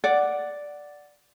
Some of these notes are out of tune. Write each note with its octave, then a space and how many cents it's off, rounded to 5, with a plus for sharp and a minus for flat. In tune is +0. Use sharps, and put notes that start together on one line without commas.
D5 +0 F#5 +0